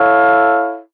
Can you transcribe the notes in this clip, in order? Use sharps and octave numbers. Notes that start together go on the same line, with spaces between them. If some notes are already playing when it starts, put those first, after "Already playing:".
Already playing: E4 A4 C#5 F5